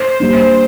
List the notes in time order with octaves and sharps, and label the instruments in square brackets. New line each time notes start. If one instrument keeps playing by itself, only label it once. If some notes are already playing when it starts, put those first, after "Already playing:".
Already playing: [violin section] C5
[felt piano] G3 A#3 D4